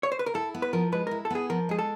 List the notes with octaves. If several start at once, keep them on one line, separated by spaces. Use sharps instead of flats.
C#5
C5
B4
A#4
E4 A4
B3
B4
F3 A#4
G#3 B4
E4 A#4
A4
B3 G#4
F3 A#4
G#3 G#4
A4